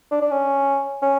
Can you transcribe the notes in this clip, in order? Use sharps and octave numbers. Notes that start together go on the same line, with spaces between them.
D4
D4
C#4
C#4